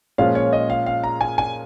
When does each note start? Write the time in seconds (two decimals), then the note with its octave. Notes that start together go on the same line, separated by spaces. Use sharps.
0.18 A#2 F3 G#3 C#4 F4 F5
0.35 C#5
0.53 D#5
0.70 F5
0.86 F5
1.04 A#5
1.21 G#5
1.38 G#5